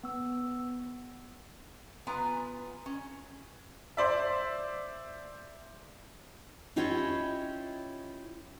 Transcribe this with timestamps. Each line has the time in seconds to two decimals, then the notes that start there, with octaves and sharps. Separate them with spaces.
0.03 B3 E6
2.07 B3 F4 B4 G#5 A#5
2.86 C#4
3.97 C5 D5 E5
6.76 C#4 E4 F4 G4 C#5 D#5